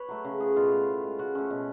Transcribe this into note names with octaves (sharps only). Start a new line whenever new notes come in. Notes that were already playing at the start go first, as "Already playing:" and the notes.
Already playing: B4 C#5
F#3 A3
C#3
F3 A3 G#4
B2 F4
A3
A2
G#3
C#3 F#4
F3 A3 C#4
B2